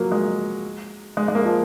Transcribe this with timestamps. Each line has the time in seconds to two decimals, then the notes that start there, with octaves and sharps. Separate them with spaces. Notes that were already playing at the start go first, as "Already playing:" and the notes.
Already playing: F3 F#3 A#3
0.12 G#3
1.17 G#3
1.28 G#3
1.35 A#3
1.45 F3